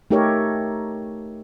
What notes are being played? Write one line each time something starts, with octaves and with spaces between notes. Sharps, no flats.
A3 D#4 G4 A4 A#4 C#5